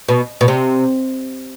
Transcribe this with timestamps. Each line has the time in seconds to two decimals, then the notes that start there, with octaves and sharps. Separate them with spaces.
0.08 B2
0.41 B2
0.48 C3